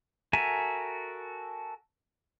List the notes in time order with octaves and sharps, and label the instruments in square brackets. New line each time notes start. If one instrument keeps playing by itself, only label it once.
[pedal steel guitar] F#4 A4 A#4 E5 G#5